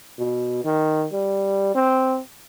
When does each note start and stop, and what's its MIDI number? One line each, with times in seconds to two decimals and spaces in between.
0.18 0.60 47
0.64 1.07 51
1.12 1.74 55
1.74 2.20 60